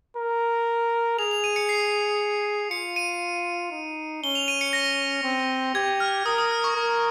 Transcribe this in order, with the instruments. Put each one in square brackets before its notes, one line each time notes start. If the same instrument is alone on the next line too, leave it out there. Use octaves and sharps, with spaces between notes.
[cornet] A#4
[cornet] G#4 [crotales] F7
[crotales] F7
D#7
C#7
C7
[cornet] F4 [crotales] C#7
[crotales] D#7
[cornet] D#4
[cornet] C#4 [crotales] G7
[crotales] F7
D#7
C#7
A#6
[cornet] C4
[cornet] G4 [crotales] G#6
[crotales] F6
[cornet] A#4 [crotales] D#6
[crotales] D#6
F6
C#6
[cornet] A#4